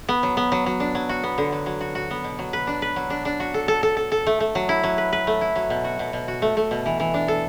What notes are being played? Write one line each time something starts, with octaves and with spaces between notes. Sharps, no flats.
B3
F#3
B3
F#3
F#3
D4
F#3
F#4
B3
D3
F#3
F#3
F#4
F#4
B3
B2
F#3
B4
D4
B4
F#3
D4
D4
F#4
A4
A4
A4
A4
A4
A3
A3
F#3
E4
F#3
B4
B4
A3
E4
F#3
B2
F#4
B2
B2
F#4
A3
A3
B2
E3
E3
D4
A4